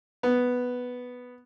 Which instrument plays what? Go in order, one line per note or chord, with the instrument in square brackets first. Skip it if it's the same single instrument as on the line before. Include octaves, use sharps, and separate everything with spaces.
[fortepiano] B3